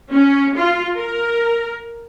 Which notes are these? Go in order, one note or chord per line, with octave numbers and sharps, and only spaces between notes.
C#4
F4
A#4